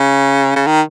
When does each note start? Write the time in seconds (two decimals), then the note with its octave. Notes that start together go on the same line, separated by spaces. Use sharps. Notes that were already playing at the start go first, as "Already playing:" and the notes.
Already playing: C#3
0.56 C#3
0.67 D#3